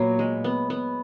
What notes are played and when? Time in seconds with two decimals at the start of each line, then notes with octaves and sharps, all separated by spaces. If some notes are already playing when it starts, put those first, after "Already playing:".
Already playing: A#2 F#3 B3
0.19 G#3
0.44 B3
0.70 B3